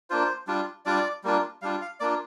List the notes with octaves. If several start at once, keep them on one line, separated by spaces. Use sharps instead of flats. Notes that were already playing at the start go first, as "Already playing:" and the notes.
A#3 D4 F4 C5
G3 D4 F4
G3 D4 F4 D5
G3 A#3 D4 F4
G3 D4 F4 F5
F5
A#3 D4 F4 D5